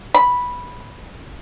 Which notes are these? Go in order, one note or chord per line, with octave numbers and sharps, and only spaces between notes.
B5